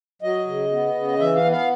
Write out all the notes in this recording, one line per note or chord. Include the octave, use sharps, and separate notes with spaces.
F#3 D#5
C#3
B3
C#3
E3 E5
F5
B3
F5